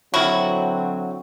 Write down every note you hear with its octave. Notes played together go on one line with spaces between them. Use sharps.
D3 D#3 F#3 C4 E4 F#4